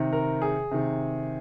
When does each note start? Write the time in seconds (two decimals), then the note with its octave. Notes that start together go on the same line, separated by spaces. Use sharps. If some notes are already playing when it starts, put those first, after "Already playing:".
Already playing: C3 D#3
0.13 A#4
0.42 G#4
0.72 C3 D#3